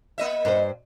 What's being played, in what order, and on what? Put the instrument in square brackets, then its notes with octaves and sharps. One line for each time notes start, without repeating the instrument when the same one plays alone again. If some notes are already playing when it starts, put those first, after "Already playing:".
[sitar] A#3 D#5 E5
[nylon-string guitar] G2 A#4 C5